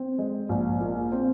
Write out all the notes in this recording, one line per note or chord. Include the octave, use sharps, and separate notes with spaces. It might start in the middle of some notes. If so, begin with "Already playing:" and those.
Already playing: C4
G#3
A#1
A#2
C4